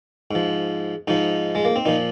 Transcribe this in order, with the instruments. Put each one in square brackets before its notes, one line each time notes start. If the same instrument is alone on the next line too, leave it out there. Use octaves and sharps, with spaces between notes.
[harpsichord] G#2 F3
G#2 F3 D#4
G#3
A#3
C4
A#2 F3 D#4